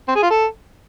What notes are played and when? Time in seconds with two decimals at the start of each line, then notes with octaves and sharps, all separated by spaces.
0.08 C4
0.15 G#4
0.23 F4
0.30 A4